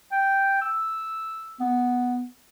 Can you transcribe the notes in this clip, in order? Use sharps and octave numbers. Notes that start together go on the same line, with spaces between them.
G5
E6
B3